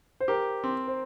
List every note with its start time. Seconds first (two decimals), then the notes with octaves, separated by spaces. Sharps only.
0.20 C5
0.28 G4 A#4
0.64 C4
0.87 C5